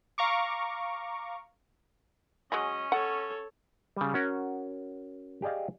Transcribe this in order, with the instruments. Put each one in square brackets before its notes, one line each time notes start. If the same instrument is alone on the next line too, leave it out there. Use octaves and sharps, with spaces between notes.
[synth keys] F5 A#5 C#6 D6
[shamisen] F#3 G#3 G#4 [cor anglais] C#4 [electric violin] D#5
[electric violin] A4 C#5 [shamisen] F#5
[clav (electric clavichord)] C#3 G3
C#4 F#4 A#4 F#5
G4 G#4 D5 D#5 F5